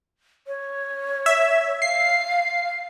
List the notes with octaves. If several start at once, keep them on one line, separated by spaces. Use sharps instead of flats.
C#5
E5
F5 C7